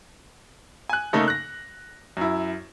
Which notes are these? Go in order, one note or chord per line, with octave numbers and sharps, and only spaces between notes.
G#5 F#6
C#3 A3 A#3 D#4 A4
F#6 A#6
F#2 E4